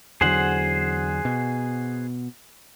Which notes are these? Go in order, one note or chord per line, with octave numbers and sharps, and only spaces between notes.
E2 D3 F#3 G#4 C5 F#5
B2